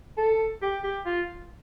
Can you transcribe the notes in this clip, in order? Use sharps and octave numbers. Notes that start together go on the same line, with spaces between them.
A4
G4
G4
F4